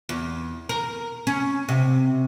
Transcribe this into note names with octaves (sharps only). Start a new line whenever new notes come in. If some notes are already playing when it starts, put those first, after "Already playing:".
E2
A#4
C#4
C3